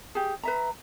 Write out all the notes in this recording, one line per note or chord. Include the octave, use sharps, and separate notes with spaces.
G4 G#4
B4 E5 A#5